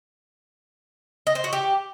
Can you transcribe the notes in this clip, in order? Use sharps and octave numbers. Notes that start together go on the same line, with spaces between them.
D#5
C5
F#4
G4